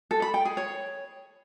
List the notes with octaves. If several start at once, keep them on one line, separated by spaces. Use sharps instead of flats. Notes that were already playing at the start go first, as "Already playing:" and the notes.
A4
B5
G5
G#4
C#5